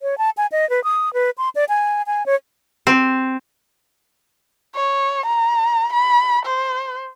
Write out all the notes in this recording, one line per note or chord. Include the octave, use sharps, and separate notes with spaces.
C#5
A5
G#5
D#5
B4
D#6
B4
C6
D5
G#5
G#5
C#5
C4
C#5
A#5
B5
C5